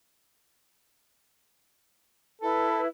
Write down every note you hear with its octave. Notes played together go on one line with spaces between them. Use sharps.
E4 A4 B4